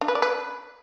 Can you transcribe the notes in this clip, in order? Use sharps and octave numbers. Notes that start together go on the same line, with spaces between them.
D4
B4
D5
B4